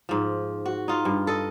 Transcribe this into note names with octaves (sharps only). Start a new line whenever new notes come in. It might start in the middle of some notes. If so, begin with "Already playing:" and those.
G#2 F3
F#4
D#4 F4
G2
A4 D#5